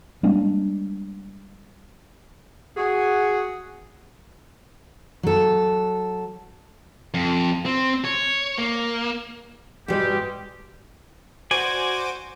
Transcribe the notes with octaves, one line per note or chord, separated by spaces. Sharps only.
G3 G#3 A#3 D4
F#4 G#4
F#3 A4
F2
C4
C#5
A#3
G#2 B2 G3 G#3 G4
F#4 C5 D5 G#5 D6